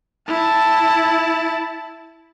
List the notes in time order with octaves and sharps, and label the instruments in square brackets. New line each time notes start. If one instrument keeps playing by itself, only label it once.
[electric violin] E4 A5